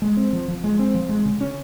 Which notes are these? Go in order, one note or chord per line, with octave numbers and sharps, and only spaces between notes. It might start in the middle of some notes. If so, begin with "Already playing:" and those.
G#3
C4
F3
F3
G#3
C4
F3
G#3
C#3
C#4